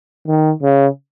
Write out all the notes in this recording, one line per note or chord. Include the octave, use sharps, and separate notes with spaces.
D#3
C#3